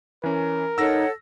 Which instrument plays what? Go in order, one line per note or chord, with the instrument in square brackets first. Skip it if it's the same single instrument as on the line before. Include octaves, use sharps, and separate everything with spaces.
[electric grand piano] E3 C#4 [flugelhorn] A#4
[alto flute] D#4 [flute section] A4 C#5 F#5 [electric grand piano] E6 A#6